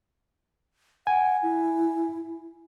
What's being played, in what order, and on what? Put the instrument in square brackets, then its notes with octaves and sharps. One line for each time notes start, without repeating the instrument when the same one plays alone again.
[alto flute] F#5 [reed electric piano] G#5
[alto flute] E4